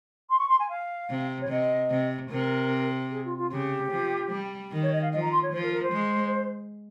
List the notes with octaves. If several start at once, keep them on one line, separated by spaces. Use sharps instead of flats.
C6
C#6
C6
G#5
F5
C3
C#5
C3 D#5
C3
C3 A#4
G#4
F4
F4
C#3 G4
F3
G3
D#3
C#5
D#5
F5
F3 D#5
A#5
C6
C#5
F3 C5
A#4
A#4
C5
G#3